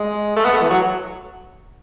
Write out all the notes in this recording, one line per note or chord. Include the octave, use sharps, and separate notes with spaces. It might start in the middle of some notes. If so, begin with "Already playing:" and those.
Already playing: G#3
A3
B3
A3
E3
F#3